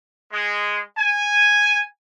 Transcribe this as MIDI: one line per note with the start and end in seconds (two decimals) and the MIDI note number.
0.32 0.79 56
0.96 1.80 80